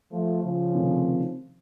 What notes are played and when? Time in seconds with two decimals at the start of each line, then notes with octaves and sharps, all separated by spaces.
0.12 F3 A3
0.43 C#3 F3
0.75 C3 D#3 A3 C4